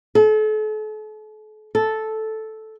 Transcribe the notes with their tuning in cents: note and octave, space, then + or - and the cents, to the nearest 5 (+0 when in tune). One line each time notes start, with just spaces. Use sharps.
A4 -40
A4 -5